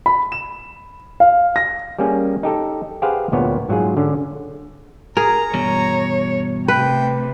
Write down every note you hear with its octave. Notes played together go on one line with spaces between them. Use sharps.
B5
E7
F5
A#6
G3 A#3 C#4 G#4
D#4 G4 A4
G4 G#4 B4 C5 F5 F#5
D2 A#2 B3 C#5
G#2 F#3 F4 G#4
D3 C#4
G#4 A#4 A#5
E2 G2 B2 C#5
C3 A3 B4 G5